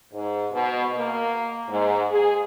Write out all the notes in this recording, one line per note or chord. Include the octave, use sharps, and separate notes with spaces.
G#2
B2
A#3
G#2
G#4